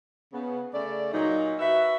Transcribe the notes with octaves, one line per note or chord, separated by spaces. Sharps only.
C#3 B3
C#3 A3 D5
A#2 F#3 D#4
F#4 B4 E5